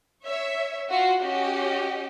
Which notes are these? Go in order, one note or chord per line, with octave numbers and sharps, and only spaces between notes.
C#5 E5
F4 F#4
C#4 F#4 G4 D#5